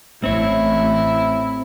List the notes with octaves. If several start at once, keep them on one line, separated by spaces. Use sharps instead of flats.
A1 A3 C4 E4 C#5